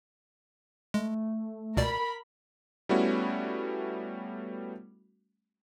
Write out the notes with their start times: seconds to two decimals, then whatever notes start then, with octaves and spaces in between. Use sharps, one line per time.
0.94 G#3 A3
1.77 C#2 B2 A#4 D5 B5
2.89 G3 A3 B3 C#4 E4 F#4